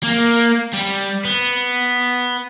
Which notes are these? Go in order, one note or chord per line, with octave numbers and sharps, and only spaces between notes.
A#3
G3
B3